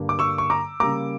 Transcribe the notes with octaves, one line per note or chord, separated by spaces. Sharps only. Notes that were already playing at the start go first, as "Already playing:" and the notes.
Already playing: G2 D3 G3 A#3
D6
C#6 E6
C#6
A#5 D6
C#3 G3 A#3 A#5 D6